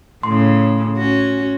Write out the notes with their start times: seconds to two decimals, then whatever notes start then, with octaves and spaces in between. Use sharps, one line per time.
0.23 A2 C#3 C6
0.97 C#4 F#4